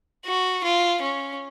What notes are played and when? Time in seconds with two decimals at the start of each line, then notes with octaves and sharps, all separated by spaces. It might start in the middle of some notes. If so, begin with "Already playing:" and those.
0.25 F#4
0.64 F4
1.01 C#4